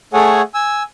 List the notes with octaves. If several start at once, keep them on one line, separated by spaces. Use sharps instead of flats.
A3 G#4 A4 C#5 F#5 G#5
G#5 E6